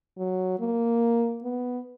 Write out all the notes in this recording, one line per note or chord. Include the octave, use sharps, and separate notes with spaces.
F#3
A#3
B3